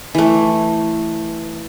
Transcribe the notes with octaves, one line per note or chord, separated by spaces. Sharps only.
E3 A3